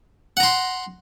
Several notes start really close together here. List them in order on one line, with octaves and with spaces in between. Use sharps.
F#5 A#5 C6